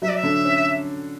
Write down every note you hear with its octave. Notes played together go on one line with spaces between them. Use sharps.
F#3 E5
D5
E5
D3
C#4